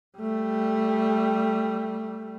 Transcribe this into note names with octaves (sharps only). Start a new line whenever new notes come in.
G3 A3